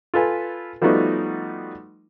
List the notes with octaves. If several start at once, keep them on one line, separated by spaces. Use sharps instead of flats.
F4 A4 B4 G#5
F3 G3 A3 B3 D#4 F#4